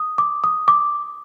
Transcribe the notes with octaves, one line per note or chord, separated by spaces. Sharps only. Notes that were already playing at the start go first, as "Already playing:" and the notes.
Already playing: D#6
D6
D#6
D6